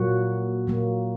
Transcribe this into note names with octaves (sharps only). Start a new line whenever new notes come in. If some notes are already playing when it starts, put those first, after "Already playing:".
Already playing: A#2 F#3 A#3 F#4
A#2 F#3 A#3